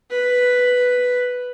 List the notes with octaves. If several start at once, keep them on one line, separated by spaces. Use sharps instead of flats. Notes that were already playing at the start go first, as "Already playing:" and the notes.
B4